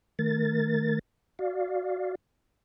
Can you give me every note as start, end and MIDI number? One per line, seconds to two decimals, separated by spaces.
0.19 0.99 51
0.19 0.99 57
0.19 0.99 70
0.19 0.99 93
1.39 2.15 66
1.39 2.15 74
1.39 2.15 77